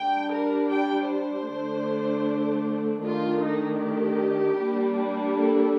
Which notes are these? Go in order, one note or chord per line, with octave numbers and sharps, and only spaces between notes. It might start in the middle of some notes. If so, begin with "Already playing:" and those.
Already playing: G3 D4 G5
A#4
G5
C5
D3 A3 D4
D#3 A3 D4 F4
D#4
G4
G3 A#3 D4
A4